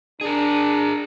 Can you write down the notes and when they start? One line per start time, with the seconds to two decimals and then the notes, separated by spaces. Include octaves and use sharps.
0.21 D4 G#4 A#4